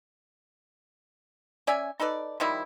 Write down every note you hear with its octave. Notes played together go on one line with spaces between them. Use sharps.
C#4 D5 E5 G#5
D#4 A4 B4 D5
D#3 F3 G3 E4